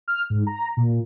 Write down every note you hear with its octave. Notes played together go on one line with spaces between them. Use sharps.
F6
G#2
A#5
A#2